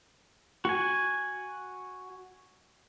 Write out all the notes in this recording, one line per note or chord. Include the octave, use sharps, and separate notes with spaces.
F#4 G#5